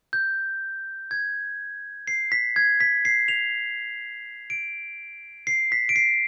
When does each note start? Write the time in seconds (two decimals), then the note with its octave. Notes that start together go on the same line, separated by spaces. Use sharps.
0.13 G6
1.11 G#6
2.07 C7
2.32 B6
2.56 G#6
2.80 B6
3.05 C7
3.28 F7
4.50 D7
5.47 C7
5.72 B6
5.89 D7
5.96 C7